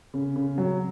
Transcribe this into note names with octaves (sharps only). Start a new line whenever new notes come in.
C#3
C#3
F#3